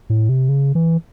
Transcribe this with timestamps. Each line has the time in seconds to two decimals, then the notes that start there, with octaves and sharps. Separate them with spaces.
0.10 A2
0.29 C3
0.49 C#3
0.75 E3